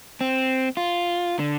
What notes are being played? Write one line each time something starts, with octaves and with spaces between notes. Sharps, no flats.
C4
F4
D3